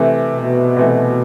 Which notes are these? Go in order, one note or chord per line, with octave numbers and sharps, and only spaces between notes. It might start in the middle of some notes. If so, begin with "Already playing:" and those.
Already playing: C3 E3 A3
B2
C3 E3 A3